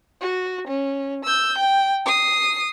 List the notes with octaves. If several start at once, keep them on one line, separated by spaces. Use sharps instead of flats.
F#4
C#4
E6 G6
G5
D#6 C7